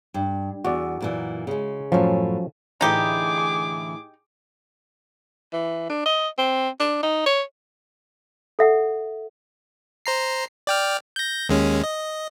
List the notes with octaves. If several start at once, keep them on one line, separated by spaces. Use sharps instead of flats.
G2
E2 F#4 D5
F#2 A#2 E3
C#3 G#3
F#2 A2 F3 F#3 C#4
A2 D3 E3 D#4 G4 G#4 D6
E3
D4
D#5
C4
D4
D#4
C#5
A4 E5 F#5
C5 A#5 C7
D5 G5 F6
G6 A#6
D#2 G#3 C#4
D#5